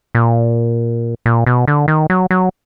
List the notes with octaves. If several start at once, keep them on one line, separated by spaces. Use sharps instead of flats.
A#2
A#2
B2
D3
D#3
F#3
F#3